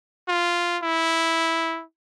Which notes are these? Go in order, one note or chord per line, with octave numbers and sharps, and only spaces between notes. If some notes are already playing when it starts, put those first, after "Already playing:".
F4
E4